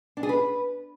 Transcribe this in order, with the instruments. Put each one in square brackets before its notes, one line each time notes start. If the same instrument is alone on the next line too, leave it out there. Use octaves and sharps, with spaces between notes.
[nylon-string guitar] D4
G#4
B4